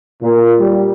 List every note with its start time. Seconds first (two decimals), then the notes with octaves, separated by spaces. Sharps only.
0.22 A#2
0.60 G3